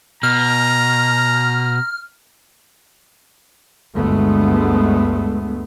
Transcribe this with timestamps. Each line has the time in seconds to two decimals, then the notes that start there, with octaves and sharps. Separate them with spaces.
0.23 B2 A#5 F6
3.96 G1 D2 G#3 A3 B3